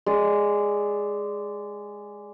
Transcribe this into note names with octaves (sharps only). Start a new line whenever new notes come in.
G#3 D5